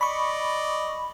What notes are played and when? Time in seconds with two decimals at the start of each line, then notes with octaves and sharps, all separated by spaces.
0.01 D5 D#5 B5 C#6